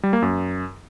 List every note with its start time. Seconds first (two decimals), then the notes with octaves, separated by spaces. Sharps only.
0.03 G3
0.13 A#3
0.22 F#2